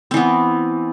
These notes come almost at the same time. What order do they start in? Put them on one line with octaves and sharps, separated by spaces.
C4 E3 B3